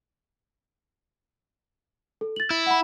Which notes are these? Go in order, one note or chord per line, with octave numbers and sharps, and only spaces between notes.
A4
A6 F#7
E4
F#5 B5